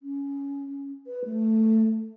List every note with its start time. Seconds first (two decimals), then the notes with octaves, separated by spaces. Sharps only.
0.03 C#4
1.07 B4
1.25 A3